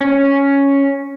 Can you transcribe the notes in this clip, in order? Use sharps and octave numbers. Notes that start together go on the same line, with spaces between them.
C#4